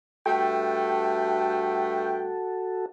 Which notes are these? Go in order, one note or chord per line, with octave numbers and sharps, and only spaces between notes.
G2 A3 F#4 A4 G5